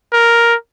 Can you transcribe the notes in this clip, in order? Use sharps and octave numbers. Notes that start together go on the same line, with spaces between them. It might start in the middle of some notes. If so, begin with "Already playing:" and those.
A#4